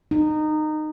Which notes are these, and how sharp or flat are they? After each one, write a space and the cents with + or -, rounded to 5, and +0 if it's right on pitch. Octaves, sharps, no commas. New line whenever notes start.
D#4 -20